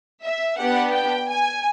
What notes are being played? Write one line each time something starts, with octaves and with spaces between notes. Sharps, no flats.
E5
B3 D4 G4 F#5
G5
G#5